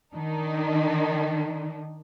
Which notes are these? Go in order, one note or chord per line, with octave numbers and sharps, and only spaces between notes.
D#3 D4 D#4